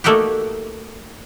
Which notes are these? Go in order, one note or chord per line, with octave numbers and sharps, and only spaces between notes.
A3 A#3 D#4 F#4 G4